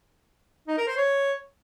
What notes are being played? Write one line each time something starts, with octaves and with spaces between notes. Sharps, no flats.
D#4
A#4
C5
C#5